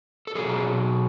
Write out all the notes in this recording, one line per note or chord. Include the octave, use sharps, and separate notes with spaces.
A4
B2 F#3 G#4